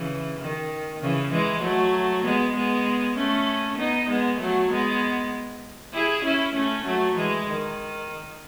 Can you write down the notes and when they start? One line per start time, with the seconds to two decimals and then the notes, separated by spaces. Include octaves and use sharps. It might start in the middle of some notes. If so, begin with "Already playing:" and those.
Already playing: C#3 E3
0.40 D#3
1.02 C#3 E3
1.33 E3 G#3
1.62 F#3 A3
2.24 G#3 B3
2.55 G#3 B3
3.17 A3 C#4
3.78 B3 D#4
4.09 G#3 B3
4.39 F#3 A3
4.71 G#3 B3
5.93 E4 G#4
6.25 C#4 E4
6.55 A3 C#4
6.86 F#3 A3
7.17 E3 G#3
7.48 D#3